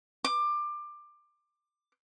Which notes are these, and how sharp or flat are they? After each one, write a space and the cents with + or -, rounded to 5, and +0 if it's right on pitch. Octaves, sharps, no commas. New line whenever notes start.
D6 +20